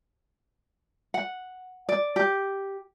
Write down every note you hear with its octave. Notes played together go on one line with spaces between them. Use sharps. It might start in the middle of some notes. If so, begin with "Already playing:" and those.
F#5
D5
G4